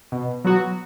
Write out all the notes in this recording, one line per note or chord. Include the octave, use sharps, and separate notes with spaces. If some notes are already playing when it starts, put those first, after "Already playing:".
B2
F#3 B3 F#4